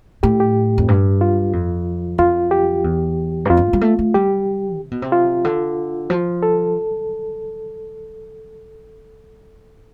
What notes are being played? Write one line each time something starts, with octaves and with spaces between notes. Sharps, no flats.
A2 G4
G4
F2
G2
F4
F2
F2 F4
G4
E2
G2
F2 F4
G2
G3
A3
A3
G3 G4
C3
B2
C3
F4
D3
F3
A4